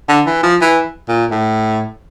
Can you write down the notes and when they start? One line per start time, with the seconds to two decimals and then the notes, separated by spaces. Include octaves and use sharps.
0.09 D3
0.26 E3
0.43 F3
0.61 E3
1.09 A#2
1.31 A2